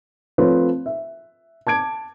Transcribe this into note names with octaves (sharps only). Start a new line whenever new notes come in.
F3 A3 C4 F4 B4 C#5
E5
A5 D6 G#6 D7